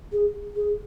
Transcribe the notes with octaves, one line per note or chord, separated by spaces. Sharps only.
G#4
G#4